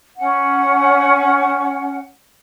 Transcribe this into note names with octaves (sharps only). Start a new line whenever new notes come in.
C#4 F#5